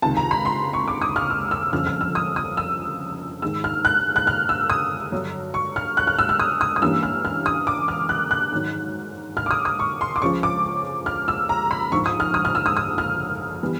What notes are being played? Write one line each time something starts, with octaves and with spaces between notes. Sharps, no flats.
C#2 C3 D#3 A5
A#5
B5
C6
C#6
D6
D#6
F6
E6
E6
G1 F2 C#3 F3 F6
F6
E6
D#6
D#6
E6
G#2 D#3 G#3 E6
F6
F#6
F#6
F6
E6
D#6
G2 D3 F#3
C#6
F6
F#6
F6
E6
F6
D#6
D#6
D#6
G2 E3 G3 A#3 C#4 E6
F6
F6
D#6
D6
F6
F#6
F#6
G#2 D#3 F#3
F6
D6
D#6
D#6
C#6
C6
D6
C#2 C#3 F3 G#3 C#4 C#6
D6
F6
E6
A#5
B5
A#1 G#2 F3 C#6
D#6
F6
D#6
F6
E6
D#6
D#6
F6
E3 G3 B3